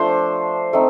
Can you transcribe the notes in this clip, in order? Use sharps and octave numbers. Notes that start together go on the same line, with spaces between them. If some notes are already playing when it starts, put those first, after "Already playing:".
Already playing: F3 A3 D4 C5
A3 C4 D#4